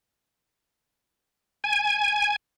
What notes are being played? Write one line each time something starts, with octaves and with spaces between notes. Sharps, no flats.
G#5